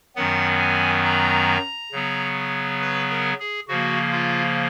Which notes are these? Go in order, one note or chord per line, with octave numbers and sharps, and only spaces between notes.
F#2 D#3 F#3 B3 F#5
G#5
A#5
C#3 F#3 B3
B4
A#4
G#4
C#3 F3 A#3 F#4
F4